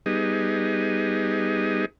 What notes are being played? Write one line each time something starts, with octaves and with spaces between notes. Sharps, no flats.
G3 B3 D#4 G#4